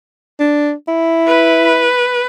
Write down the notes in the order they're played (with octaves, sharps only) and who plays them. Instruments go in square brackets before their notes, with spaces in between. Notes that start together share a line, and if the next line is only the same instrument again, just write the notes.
[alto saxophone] D4
E4
[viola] B4